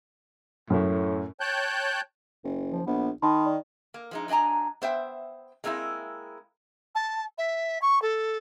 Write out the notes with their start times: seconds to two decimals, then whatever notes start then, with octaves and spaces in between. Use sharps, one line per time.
0.70 F#2 A2
1.40 C#5 G5 A5 F#6 G6
2.44 F#1
2.70 F3
2.87 A#1 B3
3.22 D#3 D#4 A5 B5 C6
3.46 D5
3.94 A#3
4.11 F3 G#3 D#4
4.28 F#3 D4 D#5 G#5 A#5
4.82 B3 C5 E5 G5
5.64 G#3 A#3 C4 D#4 E4
6.95 A5
7.38 E5
7.81 C#6
8.02 A4